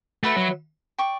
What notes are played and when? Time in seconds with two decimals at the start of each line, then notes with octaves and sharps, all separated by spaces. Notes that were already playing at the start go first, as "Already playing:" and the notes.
0.24 A3 F#4 B4 E5
0.36 F#3
0.99 D5 G5 C#6